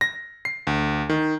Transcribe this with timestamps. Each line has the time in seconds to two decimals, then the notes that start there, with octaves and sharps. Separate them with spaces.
0.01 A#6
0.45 C7
0.67 D2
1.09 D#3